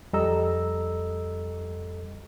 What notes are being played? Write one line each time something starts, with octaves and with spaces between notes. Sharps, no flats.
F2 G3 A4 D#5 A#5 E6